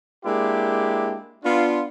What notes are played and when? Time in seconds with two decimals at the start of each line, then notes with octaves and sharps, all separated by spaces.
0.25 G#3 A#3 D4 E4 G4
1.44 B3 D4 F4